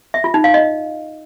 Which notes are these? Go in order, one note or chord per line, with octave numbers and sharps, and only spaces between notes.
E5
F4
D#4
F5
D#5